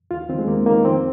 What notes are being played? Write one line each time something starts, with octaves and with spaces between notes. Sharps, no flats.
D#2 F4
D#3 C4
G#3
D#2 A#3
D#3 A#3
F2 C4